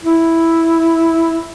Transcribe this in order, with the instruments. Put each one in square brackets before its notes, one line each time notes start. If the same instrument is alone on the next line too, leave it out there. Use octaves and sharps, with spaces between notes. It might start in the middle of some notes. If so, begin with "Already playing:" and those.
[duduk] E4